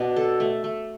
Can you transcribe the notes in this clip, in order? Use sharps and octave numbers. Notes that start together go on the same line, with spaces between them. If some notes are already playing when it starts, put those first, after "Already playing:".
Already playing: B2 D4
A4
A3
A3